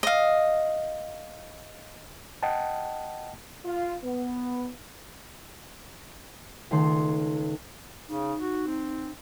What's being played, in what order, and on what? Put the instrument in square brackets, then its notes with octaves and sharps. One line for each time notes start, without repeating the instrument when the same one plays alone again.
[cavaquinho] D#5 F5
[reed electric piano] D#5 F#5 G5 A5
[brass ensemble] F4
B3
[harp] C#2 D#3 A3 A4 C6
[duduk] C#3 [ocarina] D#4
[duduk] F#4
C4